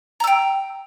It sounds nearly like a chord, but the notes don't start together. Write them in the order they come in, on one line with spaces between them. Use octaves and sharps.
A#5 E6 G5